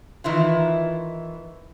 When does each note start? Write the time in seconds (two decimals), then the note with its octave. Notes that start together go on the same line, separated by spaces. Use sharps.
0.24 D#3 E3 E4 F4